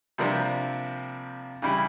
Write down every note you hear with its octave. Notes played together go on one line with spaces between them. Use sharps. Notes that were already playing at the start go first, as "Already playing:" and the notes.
C3 F3 G3 A#3 C4 D4
C#3 E3 G3 E4